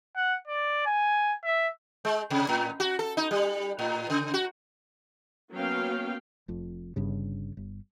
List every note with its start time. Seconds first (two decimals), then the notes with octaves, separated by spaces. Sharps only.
0.16 F#5
0.47 D5
0.86 G#5
1.44 E5
2.05 G#3
2.30 C3
2.49 A2
2.80 F#4
2.99 A4
3.17 D#4
3.31 G3
3.79 A2
4.10 C#3
4.34 F#4
5.52 F#3 A#3 B3 C#4 F5 G5
6.48 F1 F2
6.96 G1 G2 C#3
7.57 G1